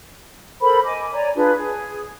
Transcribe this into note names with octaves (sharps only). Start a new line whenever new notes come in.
A4 A#4 C5 B5
D#5 G#5 D6
C#5 D5 G#5 A#5
D4 F4 G#4 B4
G#4